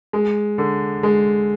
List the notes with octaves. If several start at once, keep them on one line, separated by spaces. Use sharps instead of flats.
G#3
D3
G#3